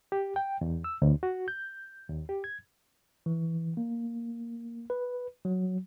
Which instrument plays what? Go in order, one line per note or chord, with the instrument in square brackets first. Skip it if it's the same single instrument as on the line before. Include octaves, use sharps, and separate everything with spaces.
[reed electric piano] G4
G5
E2
E6
D2
F#4
G6
D#2
G4
G#6
[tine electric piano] E3
A#3
B4
F#3